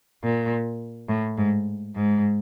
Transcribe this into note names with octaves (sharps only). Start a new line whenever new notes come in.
A#2
A2
G#2
G#2